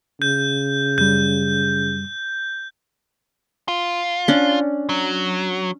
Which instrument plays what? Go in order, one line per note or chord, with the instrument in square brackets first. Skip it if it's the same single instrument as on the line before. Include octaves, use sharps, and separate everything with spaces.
[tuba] C#3 [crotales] G6
[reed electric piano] F#2 G3 [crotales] G6
[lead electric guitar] F4
[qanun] C#4 D4
[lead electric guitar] F#3